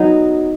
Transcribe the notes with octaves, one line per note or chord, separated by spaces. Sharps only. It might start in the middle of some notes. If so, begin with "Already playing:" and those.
Already playing: F#3 B3 D#4